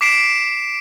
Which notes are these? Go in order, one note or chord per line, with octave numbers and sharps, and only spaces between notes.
D6 B6 C7 D7 E7